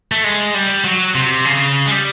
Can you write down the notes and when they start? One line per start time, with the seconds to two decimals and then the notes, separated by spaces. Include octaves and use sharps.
0.12 A3
0.24 G#3
0.54 G3
0.84 F#3
1.15 C3
1.45 C#3
1.86 G#3
1.91 G3